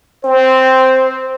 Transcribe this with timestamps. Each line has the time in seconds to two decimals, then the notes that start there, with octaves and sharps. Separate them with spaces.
0.25 C4 C5